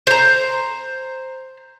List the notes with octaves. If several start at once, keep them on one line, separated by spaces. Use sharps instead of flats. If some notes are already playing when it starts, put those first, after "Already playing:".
C5 A#5